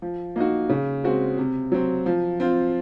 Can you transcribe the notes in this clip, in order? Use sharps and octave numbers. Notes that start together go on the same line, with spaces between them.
F3
A#3 D#4 F#4
C#3
G#3 C4 F#4
C3
F#3 C4
F3
C4 F4